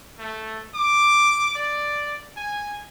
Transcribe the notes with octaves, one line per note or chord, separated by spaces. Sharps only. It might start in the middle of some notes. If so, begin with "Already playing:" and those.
A3
D6
D5
G#5